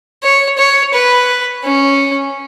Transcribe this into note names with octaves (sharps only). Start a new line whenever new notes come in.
C#5
C#5
B4
C#4